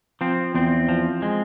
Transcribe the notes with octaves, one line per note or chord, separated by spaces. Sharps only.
F3 C4
E2 C4
F3
G#3